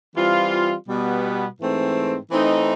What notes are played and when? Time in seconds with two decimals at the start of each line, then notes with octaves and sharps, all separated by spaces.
0.16 E3 G3 C4 F4
0.89 B2 G3 B3
1.60 G#2 E3 A3 C4
2.31 E3 A3 C4 D#4